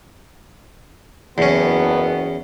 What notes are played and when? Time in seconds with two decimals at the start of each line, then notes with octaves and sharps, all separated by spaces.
1.38 F#1 E2 B3 C#4